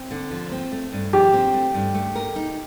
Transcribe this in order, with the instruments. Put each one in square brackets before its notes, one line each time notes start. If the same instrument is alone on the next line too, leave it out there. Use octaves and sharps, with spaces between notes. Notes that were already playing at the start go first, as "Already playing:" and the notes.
Already playing: [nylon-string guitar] C4
D3
F3
C4
A3
G2
[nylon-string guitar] F3 [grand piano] G4
[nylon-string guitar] C4
A3
G2
A3
A#4
D#4